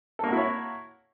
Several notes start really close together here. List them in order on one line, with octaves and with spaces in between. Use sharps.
A4 A#3 F#4 E4 C#5